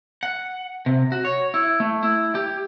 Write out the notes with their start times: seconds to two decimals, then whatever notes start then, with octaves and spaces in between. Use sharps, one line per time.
0.23 F#5
0.86 C3
1.12 F#4
1.25 C#5
1.54 E4
1.80 A3
2.03 E4
2.35 G4